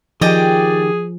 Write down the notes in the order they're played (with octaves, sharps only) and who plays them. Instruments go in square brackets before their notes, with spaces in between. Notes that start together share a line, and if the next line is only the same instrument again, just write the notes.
[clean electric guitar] D#3 G4 [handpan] F3 [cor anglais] G#4 [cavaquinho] D5 D#5 G5